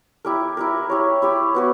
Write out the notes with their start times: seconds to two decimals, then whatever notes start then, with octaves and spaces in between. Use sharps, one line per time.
0.25 E4 G4 A#4
0.57 E4 G4 A#4
0.89 E4 G4 C#5
1.22 E4 G4 C#5
1.55 B3 F#4 B4